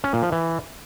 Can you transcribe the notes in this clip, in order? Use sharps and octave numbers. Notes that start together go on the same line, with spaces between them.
C#4
A#2
F3
E3